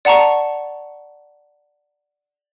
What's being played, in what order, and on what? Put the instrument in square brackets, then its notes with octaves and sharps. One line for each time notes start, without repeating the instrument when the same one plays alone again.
[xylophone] D5 F#5 A5 A#5 C#6